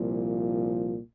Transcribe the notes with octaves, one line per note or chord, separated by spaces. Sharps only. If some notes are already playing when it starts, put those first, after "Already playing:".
Already playing: C2 A#2 F3